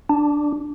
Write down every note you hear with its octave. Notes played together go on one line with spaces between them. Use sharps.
D4